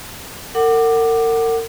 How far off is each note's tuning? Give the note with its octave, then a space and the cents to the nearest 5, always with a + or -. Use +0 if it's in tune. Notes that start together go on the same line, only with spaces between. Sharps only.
A#4 -40 F#5 +15 D6 +15